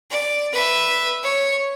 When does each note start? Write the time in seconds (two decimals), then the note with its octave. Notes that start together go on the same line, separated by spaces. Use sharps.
0.10 D5
0.52 B4 E5
1.23 C#5